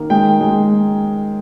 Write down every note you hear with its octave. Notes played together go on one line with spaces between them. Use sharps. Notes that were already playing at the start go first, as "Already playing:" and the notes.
Already playing: D#3 A#3
G#3 G5
G#3